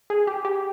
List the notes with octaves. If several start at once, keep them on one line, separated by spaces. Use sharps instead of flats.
G#4
G4
G4